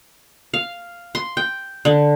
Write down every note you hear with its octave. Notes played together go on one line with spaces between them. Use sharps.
F5
C6
G5
D3